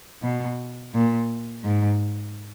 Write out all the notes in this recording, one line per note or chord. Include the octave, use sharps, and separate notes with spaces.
B2
A#2
G#2